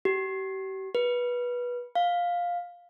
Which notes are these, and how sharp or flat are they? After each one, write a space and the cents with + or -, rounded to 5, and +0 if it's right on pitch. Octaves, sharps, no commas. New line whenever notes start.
G4 -40
B4 -20
F5 +10